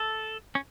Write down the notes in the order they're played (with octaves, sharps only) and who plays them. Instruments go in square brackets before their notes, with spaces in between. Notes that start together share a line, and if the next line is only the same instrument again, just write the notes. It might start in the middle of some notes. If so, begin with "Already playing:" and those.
Already playing: [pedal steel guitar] A4
C#4